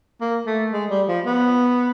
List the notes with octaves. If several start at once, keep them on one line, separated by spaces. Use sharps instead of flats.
A#3
A3
G#3
G3
F3
B3